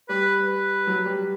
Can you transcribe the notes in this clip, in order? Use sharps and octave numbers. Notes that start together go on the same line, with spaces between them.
G3 B4
B4
F#3
G3